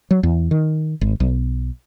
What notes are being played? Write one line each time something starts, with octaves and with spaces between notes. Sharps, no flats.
F#3
E2
D#3
G#1
B1